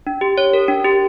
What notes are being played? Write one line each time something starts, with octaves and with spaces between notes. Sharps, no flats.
D4
G4
C#5
A#4
D4
G4